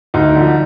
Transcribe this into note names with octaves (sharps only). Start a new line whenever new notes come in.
D2 D#4
D3 F3